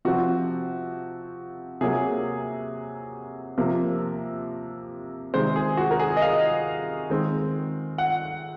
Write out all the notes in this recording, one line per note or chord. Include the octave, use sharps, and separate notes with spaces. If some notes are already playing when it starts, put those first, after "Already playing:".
C3 F3 C4 F#4
C3 F#3 A#3 G#4
C3 F3 A#3
C3 D#3 G#3 C4 C5
G#4
F#4
A#4
G#4
D#5
F5
D#3 G#3 C4
F#5